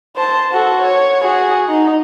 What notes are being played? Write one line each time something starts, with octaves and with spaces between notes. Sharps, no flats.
C5 A5
F#4 A4
C#5
F#4 G#4
D#4